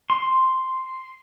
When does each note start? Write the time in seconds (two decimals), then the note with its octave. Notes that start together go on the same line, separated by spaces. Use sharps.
0.10 C6